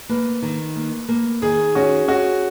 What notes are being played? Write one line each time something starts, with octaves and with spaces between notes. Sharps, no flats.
A#3 B4
D#3
A#3
A#3
D#3 G#4
C#4 F#4
C#4 F#4